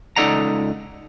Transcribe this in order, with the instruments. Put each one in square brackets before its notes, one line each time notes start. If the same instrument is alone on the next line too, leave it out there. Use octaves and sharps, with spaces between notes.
[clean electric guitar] C#2 D#4 A4 D5 F#5 A#5